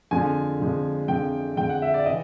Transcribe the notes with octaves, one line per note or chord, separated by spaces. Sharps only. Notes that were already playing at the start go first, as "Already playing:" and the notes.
F2 D3 F3 G#3 G#5
F2 D3 F3 G#3
F2 D3 F3 G#3 G5
F2 D3 F3 G#3 G5
F#5
E5
D5
C#3 E3 D#5